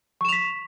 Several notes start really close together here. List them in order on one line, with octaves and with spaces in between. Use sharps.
C#6 E7 F7 B6